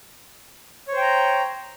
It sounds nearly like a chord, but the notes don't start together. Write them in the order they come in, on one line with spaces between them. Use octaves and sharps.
C#5 C5 G5 A#5